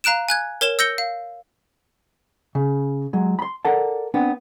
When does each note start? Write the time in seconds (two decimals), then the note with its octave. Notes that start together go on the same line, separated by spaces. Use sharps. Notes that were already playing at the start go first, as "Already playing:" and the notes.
0.04 F5 A#5 F#6 D7 E7
0.29 G#5 F#6 G#6
0.61 A#4 C#5 E7 G7
0.79 E6 G6 A#6 C#7 G7
0.98 F5
2.55 C#3
3.13 F#3 G#3
3.39 B5 C6
3.65 A4 A#4 D5 F#5 A5
4.14 B3 C4 D4